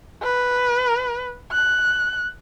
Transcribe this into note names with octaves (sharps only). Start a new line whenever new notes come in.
B4
F#6